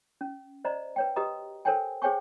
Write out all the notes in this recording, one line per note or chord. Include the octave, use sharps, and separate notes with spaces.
C#4
C5 D5 D#5 A#5
B4 C#5 G5
F#4 G4 B4 D#5 A#5 D#6
A4 A#4 C5 C#5 G5 G#5
G#4 C5 C#5 G5 G#5 C#6